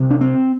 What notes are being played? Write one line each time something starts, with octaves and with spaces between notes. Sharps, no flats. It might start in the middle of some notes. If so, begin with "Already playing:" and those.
Already playing: C2 C3
D4
C4